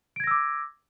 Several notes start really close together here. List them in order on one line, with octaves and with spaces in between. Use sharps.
D7 G#6 A#6 E6 D6